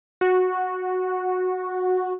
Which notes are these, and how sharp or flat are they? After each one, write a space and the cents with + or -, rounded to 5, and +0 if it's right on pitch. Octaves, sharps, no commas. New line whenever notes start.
F#4 -10